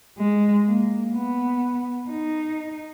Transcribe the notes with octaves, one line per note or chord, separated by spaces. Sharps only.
G#3
A#3
B3
D#4